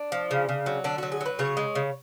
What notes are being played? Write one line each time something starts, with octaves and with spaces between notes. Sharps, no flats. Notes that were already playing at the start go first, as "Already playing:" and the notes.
Already playing: D4
F3
C#3
C#3
F#3
D3 D4
F#3 F#4
G#4
F#3
B4
C#3 C#5
G#3
C#3